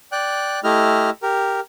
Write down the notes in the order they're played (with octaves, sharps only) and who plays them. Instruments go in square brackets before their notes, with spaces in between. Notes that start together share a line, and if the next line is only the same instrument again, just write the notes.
[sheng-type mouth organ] D5 G5 F#6
A3 E4 G4 D#5 F6
G4 A#4